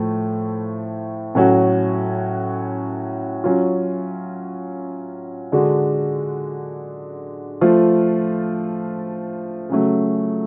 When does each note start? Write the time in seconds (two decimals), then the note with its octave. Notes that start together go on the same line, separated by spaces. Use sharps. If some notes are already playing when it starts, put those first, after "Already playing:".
Already playing: A2 F3 A3
1.35 A2 F#3 C#4 F#4
3.44 F#3 C#4 F4
5.52 D3 G#3 D4 F#4
7.61 F3 A3 F4
9.69 C#3 F#3 A3